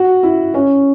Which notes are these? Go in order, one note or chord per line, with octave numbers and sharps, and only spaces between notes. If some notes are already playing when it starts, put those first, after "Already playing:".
Already playing: F#4
E4
C#4